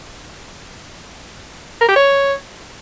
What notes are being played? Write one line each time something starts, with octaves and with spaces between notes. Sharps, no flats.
A#4
G4
C#5